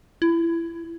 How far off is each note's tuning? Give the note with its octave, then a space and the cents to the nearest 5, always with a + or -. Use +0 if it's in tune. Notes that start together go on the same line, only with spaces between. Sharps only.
E4 +25